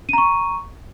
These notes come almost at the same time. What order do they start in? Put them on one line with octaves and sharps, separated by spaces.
D#7 A#5 C#6